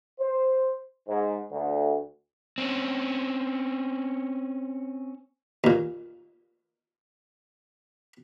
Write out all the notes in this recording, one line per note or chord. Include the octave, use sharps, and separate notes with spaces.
C5
G#2
D2
C4 C#4
D#2 A#2